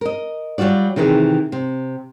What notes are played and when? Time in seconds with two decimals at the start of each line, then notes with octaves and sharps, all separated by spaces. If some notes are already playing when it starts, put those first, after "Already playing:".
0.01 A#4 D#5
0.58 F#3 G3 F4 F#4 D5
0.96 C3 D#3 E3 G4 G#4
1.52 C3